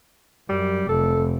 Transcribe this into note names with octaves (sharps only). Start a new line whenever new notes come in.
F#2 G3
F1 A4